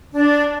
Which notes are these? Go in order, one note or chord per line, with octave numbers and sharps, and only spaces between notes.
D4